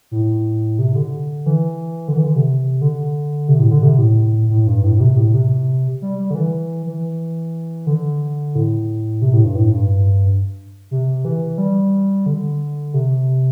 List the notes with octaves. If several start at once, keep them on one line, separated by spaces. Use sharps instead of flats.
A2
C3
D3
E3
D3
E3
D3
C3
D3
C3
A2
D3
C3
A2
A2
G2
A2
A2
C3
A2
C3
G3
G3
D3
E3
E3
D3
A2
C3
A2
G2
A2
G2
C3
E3
G3
D3
C3